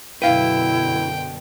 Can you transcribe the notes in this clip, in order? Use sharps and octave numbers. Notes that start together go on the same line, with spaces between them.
F#2 B2 D3 E4 B4 F5 G5